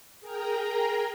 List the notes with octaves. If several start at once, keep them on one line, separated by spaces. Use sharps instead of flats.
G#4 A#4 G5 A#5